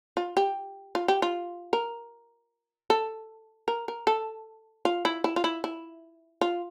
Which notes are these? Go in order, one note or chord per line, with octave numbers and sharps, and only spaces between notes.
F4
G4
F4
G4
F4
A#4
A4
A#4
A#4
A4
F4
E4
E4
F4
E4
E4
F4